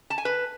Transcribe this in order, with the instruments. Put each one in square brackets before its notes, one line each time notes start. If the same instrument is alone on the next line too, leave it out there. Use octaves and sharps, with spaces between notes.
[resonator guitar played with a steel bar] A5
G#5
B4